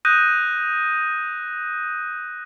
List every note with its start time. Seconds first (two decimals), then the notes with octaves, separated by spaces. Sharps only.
0.05 D#6 F#6 G6 A#6 D#7